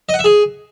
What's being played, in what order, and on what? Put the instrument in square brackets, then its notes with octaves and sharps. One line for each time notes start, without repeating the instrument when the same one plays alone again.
[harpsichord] D#5
F#5
E5
G#4